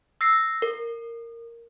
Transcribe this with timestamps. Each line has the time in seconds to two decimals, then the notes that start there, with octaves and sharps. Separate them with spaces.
0.21 E6 A#6 C7
0.62 A#4